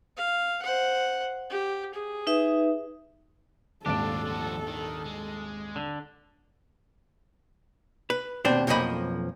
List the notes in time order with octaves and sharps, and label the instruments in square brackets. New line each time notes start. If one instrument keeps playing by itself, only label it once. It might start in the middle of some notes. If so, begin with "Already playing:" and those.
[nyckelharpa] F5
C5 F#5
G4
G#4
[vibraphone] D#4 B4 E5
[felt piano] D#1 G#1 D7 [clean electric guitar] D4 [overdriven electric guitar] F4 G4 [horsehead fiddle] A4
[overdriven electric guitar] F3 F#4
D#3
G#3
[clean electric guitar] D3
[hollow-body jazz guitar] B4
D#2 B2 C4 D4 C5
B1 F2 F3 A#3 D#5 B5